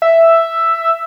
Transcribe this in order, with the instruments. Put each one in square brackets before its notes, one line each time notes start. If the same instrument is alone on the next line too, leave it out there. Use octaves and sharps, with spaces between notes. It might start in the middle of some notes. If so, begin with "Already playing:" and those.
[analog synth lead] E5